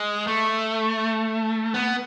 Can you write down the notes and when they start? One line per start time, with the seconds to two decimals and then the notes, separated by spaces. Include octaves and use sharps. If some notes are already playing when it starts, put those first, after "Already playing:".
Already playing: G#3
0.27 A3
1.74 B3